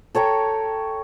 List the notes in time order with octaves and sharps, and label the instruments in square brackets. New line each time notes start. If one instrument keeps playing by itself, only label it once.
[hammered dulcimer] A4 C#5 G5 A#5